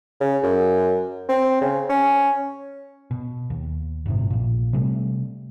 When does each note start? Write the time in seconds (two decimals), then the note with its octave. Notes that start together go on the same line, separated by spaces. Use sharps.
0.21 C#3
0.43 F#2
1.29 C4
1.61 C#3
1.89 C#4
3.11 B2
3.50 D#2
4.06 G1 A2 C3
4.30 A#1 A#2
4.73 C3 G3 A3